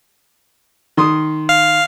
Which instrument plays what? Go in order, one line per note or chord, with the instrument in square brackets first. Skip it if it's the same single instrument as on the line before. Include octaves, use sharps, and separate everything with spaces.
[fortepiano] D#3 C6 D#6
[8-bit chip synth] F5